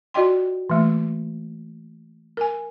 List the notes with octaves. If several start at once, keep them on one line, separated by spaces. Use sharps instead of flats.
F4 F#4 D5 D#5 G5 C6
E3 A3 A#3
A#4 G#5